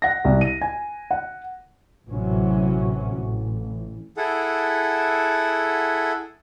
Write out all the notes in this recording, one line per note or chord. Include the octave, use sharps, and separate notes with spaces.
F#5 A#6
C2
D#7
G#5
F#5
A1 C3 E3 F#3 C#4
A1
E4 G#4 A4 F#5